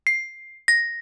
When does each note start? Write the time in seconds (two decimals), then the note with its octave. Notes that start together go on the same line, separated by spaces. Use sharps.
0.07 C7
0.68 A#6